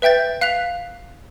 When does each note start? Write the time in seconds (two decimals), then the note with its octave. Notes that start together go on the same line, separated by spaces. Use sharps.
0.02 B4 E5 G5 G6 A6
0.41 F5 F#6 B6 F7